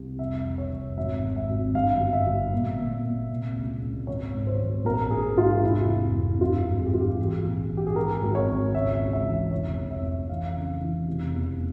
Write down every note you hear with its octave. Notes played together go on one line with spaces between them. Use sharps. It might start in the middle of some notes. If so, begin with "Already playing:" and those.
Already playing: C2
F1 E5
F1
C#5
F1
G#1 E5
G#1
E5
G#1
G2 F5
G1
E5
G1
A#2
A#2
A#2
C3
C#2
C#2
G#1 C#5
G#2
C5
G#1
A#1 A#4
A#1 G#4
G#2 F4
F1 E4
F1
F2
G2 F4
G#1
G#4
G4
G#1 F4
G4
E3 G#4
A#1
E3
G4
G#4
G#1 A#4
G#1
C#5
G#1
C#2 E5
C#2
E5
E3
F1 C#5
F2
E5
F2
E3 F5
C#3
E3
F1
E2